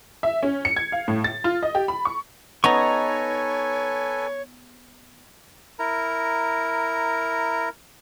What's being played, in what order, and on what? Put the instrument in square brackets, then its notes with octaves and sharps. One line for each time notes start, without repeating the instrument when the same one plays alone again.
[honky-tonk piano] E5
C#4
C#7
G#6
F5
A2
A6
F4
D#5
G4
B5
C#6
[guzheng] B3 D#4 [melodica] A4 B4 G#5 [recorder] C#5 [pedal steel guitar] A#5 C#6
[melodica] E4 A#4 A#5